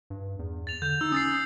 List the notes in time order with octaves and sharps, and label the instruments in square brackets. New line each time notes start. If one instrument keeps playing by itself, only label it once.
[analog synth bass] G2
E2
[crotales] A6 F7
[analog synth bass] D3 [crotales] G6
[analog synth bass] D#4 [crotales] E6
[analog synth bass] C#4 [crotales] D#6 A6 C7